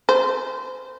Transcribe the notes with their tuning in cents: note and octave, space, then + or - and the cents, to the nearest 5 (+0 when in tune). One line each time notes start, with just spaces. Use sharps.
C5 -25